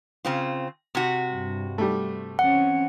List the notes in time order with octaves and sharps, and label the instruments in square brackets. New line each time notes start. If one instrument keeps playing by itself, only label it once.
[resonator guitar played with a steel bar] C#3 C4 F4
C3 F#4
[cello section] G2
[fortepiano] G3 A3
[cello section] E3 C4 C#4 [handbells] F#5